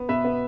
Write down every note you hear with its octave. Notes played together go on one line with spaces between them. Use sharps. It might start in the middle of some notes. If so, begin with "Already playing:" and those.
Already playing: B3
B2 B4 E5
B3